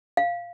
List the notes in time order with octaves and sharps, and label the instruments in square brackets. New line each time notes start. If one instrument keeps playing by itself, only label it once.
[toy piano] F5